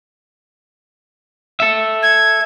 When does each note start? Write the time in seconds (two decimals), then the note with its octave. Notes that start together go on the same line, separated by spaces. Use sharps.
1.60 A4 E5
2.03 G#6